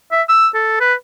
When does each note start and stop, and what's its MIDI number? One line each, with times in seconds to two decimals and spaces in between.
0.12 0.22 76
0.29 0.48 88
0.54 0.79 69
0.80 0.94 71